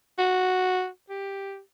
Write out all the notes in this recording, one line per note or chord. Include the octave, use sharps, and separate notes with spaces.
F#4
G4